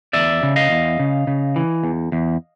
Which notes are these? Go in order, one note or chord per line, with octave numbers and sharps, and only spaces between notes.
E2 D5 E5
C#3
D#5 F5
E2
C#3
C#3
E3
E2
E2